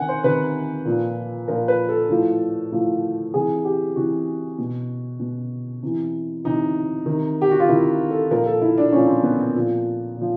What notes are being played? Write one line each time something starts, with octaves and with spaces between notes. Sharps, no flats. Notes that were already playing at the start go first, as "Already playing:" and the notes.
Already playing: C3 D#3 F#5 G#5
C5
C3 D#3 B4
A#2 F3
A#2 F3 A#4
B4
A4
A2 F3
A2 F3
C3 E3 G#4
G4
C3 E3 F#4
B2
B2
C3 E3
C3 E3 D#4
C3 D#3
G4
F#4
F4
C3 D#3 E4
A4
A#2 F3 A#4
A4
E4
D4
A#2 F3 C#4
C4
B3
C4
A#2 F3
A#2 F3